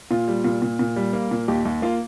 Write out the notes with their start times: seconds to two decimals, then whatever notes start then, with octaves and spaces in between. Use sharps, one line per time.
0.11 A#2 F4
0.28 G3
0.44 A#2
0.62 A#2
0.79 A#2
0.96 G3
1.13 A#3
1.31 A#2
1.48 D#2 G4
1.65 D#2
1.82 A#3 F4